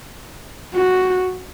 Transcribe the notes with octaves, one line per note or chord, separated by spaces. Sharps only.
F#4